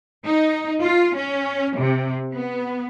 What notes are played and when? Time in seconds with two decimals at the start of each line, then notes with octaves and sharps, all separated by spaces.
0.25 D#4
0.80 F4
1.15 C#4
1.76 C3
2.33 B3